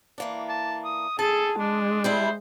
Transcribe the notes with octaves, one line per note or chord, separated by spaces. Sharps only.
E3 A#3 D4
A5
D#6
G#4 A4 A5
G#3 D4
G3 D4 E4 C5